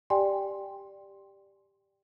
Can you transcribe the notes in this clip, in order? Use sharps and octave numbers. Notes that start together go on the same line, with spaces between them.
G4 D5 G5 G#5 C6